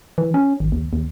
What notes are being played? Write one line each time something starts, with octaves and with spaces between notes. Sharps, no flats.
E3
C#4
G#1
D#2
D#2